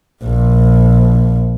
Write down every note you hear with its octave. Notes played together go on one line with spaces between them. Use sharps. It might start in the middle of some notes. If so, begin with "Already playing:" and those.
A#1